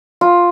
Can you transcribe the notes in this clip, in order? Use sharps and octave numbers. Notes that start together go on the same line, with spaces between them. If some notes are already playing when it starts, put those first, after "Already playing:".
F4